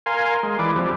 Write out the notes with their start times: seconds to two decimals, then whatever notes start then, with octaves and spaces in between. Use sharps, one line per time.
0.06 A#4 F5 G#5 C6
0.43 G#3
0.59 E3 B4 D5 D6
0.76 F2 G3